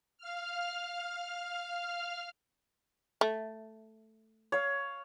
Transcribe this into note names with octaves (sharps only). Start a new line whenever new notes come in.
F5 F6
A3
C#5 F5